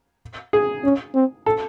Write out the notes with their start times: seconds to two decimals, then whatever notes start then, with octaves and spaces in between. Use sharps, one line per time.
0.53 G#4
0.84 C#4
1.15 C4
1.46 A4